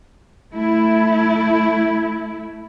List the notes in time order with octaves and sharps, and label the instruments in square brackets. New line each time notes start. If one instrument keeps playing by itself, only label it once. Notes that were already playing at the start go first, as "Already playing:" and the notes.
[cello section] A3 E4